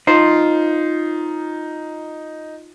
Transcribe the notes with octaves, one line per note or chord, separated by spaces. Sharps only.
D#4 F4 C5